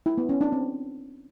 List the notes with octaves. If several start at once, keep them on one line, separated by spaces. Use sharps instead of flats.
E4
B3
C#4
D4
C4